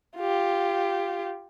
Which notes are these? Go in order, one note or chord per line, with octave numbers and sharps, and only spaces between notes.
F4 G4